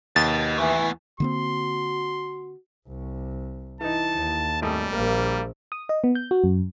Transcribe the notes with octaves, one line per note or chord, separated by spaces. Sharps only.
D#2 B4 D#5 A6
E3 A3 B3
D3 A#3 C4 F#4 C6
C2
E3 D#4 A5
D#2
G#1 G3 A3 D#6
A#1 A#3 A#4
D#6
D#5
B3
G6
F#4
F#2